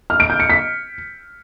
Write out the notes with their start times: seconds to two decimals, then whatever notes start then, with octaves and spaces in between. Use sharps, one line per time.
0.10 F6
0.20 D7
0.30 G6
0.40 C#7
0.50 B6